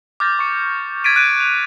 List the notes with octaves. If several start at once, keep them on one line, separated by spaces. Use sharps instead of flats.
D6 F6 G6 A6 A#6
C#6 C#7
G#6 A6 B6 D7 D#7
F#6 D7 D#7
F7